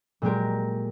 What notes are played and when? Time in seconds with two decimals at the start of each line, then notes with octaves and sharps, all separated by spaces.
0.22 A#2 F#3 G#3 G4 A#4